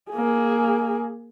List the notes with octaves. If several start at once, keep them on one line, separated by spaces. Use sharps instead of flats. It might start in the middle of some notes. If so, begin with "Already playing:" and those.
A#3 G#4